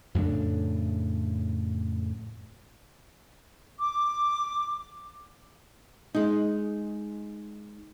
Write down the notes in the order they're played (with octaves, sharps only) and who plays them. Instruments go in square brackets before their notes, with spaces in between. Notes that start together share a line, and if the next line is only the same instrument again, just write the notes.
[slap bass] F2 A2 C#3 D4
[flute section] D6
[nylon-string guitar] G#3 D#4